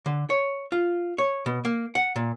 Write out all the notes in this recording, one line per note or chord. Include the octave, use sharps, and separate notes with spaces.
D3
C#5
F4
C#5
B2
A#3
F#5
A#2